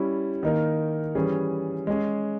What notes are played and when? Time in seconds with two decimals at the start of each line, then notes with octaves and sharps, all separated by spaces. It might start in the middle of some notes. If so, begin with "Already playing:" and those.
Already playing: G3 C#4 E4
0.43 D#3 A#3 D#4 A#4
1.15 E3 G3 C#4 G#4
1.87 G#3 C#4 G#4